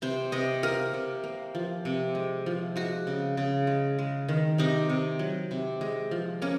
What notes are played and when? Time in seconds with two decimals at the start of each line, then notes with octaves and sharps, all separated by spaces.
0.02 C3 C5
0.32 C3 D#5
0.63 A#3 A#4
0.93 C3
1.24 A#3
1.55 F3
1.85 C3
2.15 G#3
2.46 F3
2.76 G#3 F#4
3.07 C#3
3.37 C#3
3.67 G#3
3.99 G#3
4.29 D#3
4.58 C3 D#4
4.90 C3
5.19 F#3
5.51 C3
5.81 G#3
6.11 F3
6.42 A#3 C#4